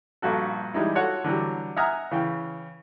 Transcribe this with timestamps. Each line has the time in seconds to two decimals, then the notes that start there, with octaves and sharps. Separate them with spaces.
0.22 A#1 G2 F#4 A4
0.74 E3 G3 G#3 D#4 E4
0.95 F4 F#4 A4 C#5 F#5
1.24 D3 E3 F#3 G3
1.76 E5 F#5 G#5 A#5 D#6 F6
2.11 C#3 E3 G5